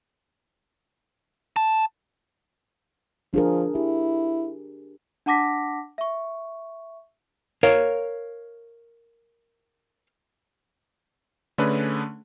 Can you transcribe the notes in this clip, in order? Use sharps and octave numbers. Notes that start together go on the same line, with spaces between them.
A5
F3 D4 G#4 A#4
E4 G4
D4 F#5 A5 D6 A#6 B6
E5 C#6
A#4 C#5 F5
D3 A3 C#4 D4 G#4 B4